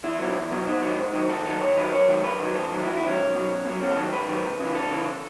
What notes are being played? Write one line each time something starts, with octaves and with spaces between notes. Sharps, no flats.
E2 E4
B2 F#3
E2
B2 F#3
G#2 D#4
D#3 F#3
G#2
D#3 F#3
D#2 A4
D#3 F#3 A4
D#2 C#5
D#3 F#3 B4
F#2 C#5
D#3 F#3
F#2 B4
D#3 F#3
E2 A4
D#3 F#3
E4
E2 F#4
E4
D#3 F#3 C#4
B1
B2 F#3
B1
B2 F#3
G#2 C#4
A4
D#3 F#3
G#2 B4
D#3 F#3
C#2
C#3 E3
C#2 A4
C#3 E3